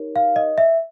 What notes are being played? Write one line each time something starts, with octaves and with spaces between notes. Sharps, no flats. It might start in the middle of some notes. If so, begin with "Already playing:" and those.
Already playing: D#4 G4 A#4 C#5
F5
D#5
E5